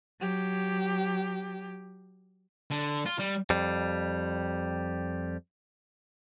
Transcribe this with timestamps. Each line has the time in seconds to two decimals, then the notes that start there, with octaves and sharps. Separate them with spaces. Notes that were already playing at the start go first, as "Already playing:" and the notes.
0.19 F#3 G4
2.71 D3
3.06 F4
3.19 G3
3.50 F2 G3